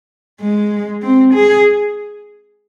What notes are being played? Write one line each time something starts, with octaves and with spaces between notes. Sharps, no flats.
G#3
C4
G#4